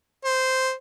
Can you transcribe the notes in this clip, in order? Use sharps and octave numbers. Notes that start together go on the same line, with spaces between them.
C5